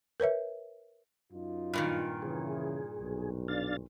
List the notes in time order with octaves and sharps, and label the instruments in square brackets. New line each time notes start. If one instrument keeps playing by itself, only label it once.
[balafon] A#4 B4 C#5 E5
[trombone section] F#2 D#4 F4
[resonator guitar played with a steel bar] G2 A#2 D#3
[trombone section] C#3 E3 [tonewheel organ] G#4
[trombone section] B1
[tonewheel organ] D4 F5 A6